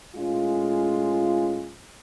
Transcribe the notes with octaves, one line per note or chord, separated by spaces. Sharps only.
A2 G#3 C#4 F4